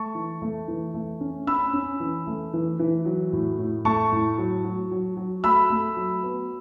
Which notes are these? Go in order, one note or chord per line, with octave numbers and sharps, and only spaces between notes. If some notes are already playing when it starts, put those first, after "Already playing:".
Already playing: A3 A5 C#6
E3
A3
E3
A3
C#4
C#4 B5 E6
C#4
E3
A3
E3
E3
F#3
A2
A2
A3 A5 C#6
A2
F#3
F#3
F#3
F#3
A3 B5 E6
A3
F#3
B3